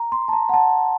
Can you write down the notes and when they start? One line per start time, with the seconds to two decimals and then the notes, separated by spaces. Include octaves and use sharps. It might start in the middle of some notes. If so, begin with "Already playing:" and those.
Already playing: A#5
0.12 C6
0.28 A5
0.33 A#5
0.49 F#5
0.54 A5